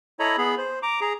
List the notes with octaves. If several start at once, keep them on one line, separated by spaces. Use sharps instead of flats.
E4 A4 C#5 D#5 A#5 B5
B3 G#4 B5
C5
A#5 D6
G#4 A#5